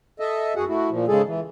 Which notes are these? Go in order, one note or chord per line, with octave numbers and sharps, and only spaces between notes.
A4 D#5 E5
F#2 F#4 G#4 F#5
A3 E4 F#4
A#2 F3
G#2 C#3 G#3 G#4 A4
E3